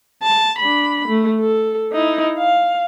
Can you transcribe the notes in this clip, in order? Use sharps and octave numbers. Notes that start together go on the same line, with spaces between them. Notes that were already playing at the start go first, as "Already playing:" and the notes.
A5
D4 B5
A3
A4
D#4 E4
F5